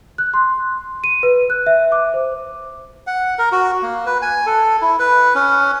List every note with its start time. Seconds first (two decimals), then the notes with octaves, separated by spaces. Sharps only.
0.18 F#6
0.34 C6
1.04 D#7
1.23 B4
1.50 F#6
1.67 E5
1.92 D6
2.14 C5
3.07 F#5
3.38 A#4
3.52 F#4
3.82 A#3
4.06 B4
4.22 G#5
4.46 A4
4.82 E4
4.99 B4
5.35 C#4